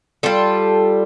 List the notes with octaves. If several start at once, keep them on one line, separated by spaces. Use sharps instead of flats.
G3 F4 A4